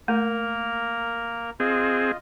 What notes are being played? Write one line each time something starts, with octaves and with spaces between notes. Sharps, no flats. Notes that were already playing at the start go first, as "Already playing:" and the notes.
A3 A#3 A#4 A#5
C4 F4 G#4 D#5